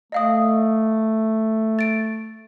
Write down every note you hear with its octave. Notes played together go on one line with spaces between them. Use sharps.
A3 D#5 F5 D#6
A6 D7